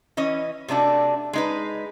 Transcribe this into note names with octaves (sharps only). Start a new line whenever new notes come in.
E3 C#4 D#5
C3 A3 D4 F#4
G#3 D#4 B4